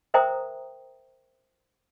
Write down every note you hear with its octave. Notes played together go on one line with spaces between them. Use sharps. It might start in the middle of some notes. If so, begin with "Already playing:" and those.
A#4 C5 E5 G5 A#5 D#6